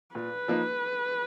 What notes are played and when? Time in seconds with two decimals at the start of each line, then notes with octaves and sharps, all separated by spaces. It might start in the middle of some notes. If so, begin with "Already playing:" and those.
0.15 A#2 B4
0.48 F3 A#3 D#4